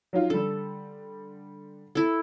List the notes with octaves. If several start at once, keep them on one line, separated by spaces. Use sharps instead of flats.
F#3 D#4 F4
D3 G3 A4
E4 A4